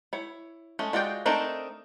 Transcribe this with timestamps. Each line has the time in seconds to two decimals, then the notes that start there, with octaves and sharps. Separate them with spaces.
0.13 E4 C#5
0.79 G#3 A3 C#4
0.93 G#3 F4 F#4 D5 G5
1.26 A3 C4 D4 D#4 A#4